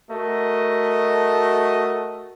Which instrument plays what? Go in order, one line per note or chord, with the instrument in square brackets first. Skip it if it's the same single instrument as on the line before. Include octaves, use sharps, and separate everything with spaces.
[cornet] A3 [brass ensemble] F#4 A#4 D#5